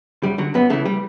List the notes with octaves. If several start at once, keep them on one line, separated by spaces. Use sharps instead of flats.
F#2 G3
D3 F#3
F#2 B3
C#3 E3 A3
G3